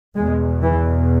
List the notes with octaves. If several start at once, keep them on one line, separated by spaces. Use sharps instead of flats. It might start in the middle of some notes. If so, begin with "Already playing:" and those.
E2 B2 G#3
E3